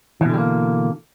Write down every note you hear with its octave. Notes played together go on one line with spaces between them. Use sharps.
B2 D3 E3 G3 A#3